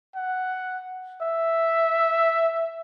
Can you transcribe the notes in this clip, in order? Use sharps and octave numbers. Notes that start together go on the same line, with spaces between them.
F#5
E5